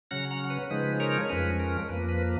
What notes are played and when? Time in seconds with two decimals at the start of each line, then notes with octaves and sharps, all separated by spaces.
0.11 C#3 F#3 C#4 F#5 A#5
0.31 F#5 A#5
0.50 B4
0.71 C#3 F3 G#3 D#4 B4
1.00 A#4 C#5
1.29 F2 F3 G#3 C#4 B4
1.60 A#4
1.89 F2 F3 A#3 B4
2.09 B4